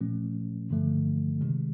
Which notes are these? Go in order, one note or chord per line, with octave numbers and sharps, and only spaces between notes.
A#2 F3 A3 C#4
G2 D3 F3 A3
C3 D#3 G#3